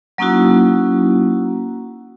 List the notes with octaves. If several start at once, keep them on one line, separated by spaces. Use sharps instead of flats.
F#3 A#3 C#4 D#4 E4 F#4